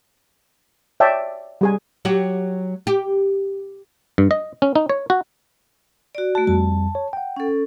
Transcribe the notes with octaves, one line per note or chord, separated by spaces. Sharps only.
C#5 D5 E5 G5 A5
G3 G#4 G#5
F#3 F#4 G4
G4
G2
D#5
C#4
D#4
C#5
F#4
F#4 D5
A3 F#4 A5
F2 G3 A5
C#5
F#5 G5
C#4 A4